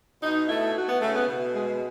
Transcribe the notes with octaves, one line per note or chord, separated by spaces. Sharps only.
B2 D#4
A3 E4
A3 F#4
B3
C#3 A3
B3
B2
G#3